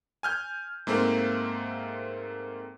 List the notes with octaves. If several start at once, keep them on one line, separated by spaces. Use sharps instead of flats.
G#5 F6 G6
G#2 A3 A#3 C4